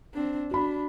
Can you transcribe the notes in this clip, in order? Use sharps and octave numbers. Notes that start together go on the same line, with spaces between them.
C4 D4
D4 F#4 B5